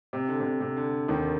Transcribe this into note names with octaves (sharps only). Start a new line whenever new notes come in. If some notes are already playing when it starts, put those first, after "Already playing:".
C3
D3
C3
D3
C3
D3
D#2 D#3